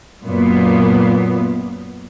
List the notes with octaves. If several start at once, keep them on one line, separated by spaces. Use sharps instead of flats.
F#2 A#2 B3